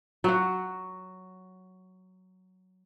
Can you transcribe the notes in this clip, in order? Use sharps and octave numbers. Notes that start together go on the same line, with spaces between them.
F#3 F#4